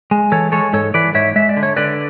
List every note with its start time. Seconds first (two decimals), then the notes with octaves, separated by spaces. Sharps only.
0.11 G#3
0.32 E3 A4 C#5
0.52 G#3 A4 C#5
0.73 G#2 A4 C#5
0.94 E3 B4 D5
1.14 G#2 C#5 E5
1.36 G#3 E5
1.49 D5
1.56 D3
1.63 C#5
1.76 D3 B4 D5